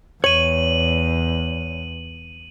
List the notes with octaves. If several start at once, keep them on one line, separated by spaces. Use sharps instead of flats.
E2 C#5 D#7 F#7